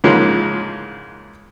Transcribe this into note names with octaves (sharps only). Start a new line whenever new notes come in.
G#2 C#3 E3 F3 G#3 A#3